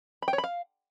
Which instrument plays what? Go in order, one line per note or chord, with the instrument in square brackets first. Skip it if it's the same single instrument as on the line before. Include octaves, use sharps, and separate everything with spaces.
[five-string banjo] B5
G5
C#5
B5
F5